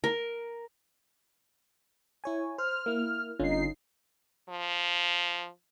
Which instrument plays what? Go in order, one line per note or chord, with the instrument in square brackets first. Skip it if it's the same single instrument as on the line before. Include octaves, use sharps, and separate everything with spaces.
[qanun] A#4
[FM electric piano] E4 C#5 G#5
[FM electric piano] C5 [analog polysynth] F6
[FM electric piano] A#3 E4
[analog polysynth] G1 D#4 C7 [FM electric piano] D3 C#4 F4
[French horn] F3